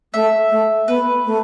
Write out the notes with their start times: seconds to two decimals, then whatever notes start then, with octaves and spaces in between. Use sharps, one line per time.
0.13 A3 E5
0.50 A3
0.87 B3 B4
1.25 A3